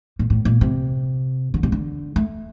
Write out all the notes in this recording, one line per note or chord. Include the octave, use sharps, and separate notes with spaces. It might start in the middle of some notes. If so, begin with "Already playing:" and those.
A#2
A2
A#2
C3
D3
C3
D3
A3